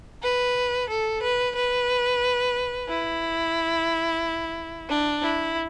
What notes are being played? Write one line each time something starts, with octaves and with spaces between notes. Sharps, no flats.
B4
A4
B4
B4
E4
D4
E4